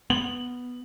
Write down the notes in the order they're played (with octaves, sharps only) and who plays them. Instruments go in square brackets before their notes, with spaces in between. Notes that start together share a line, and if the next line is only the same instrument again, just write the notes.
[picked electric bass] B3 [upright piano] F#7